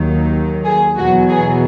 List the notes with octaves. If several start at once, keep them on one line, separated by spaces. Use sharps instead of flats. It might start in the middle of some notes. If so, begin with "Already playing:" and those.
Already playing: D#2 D#3 F#3
G#4
E2 B2 F#3 F#4
G#4